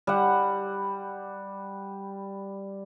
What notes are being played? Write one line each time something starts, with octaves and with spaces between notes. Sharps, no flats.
G3 F#5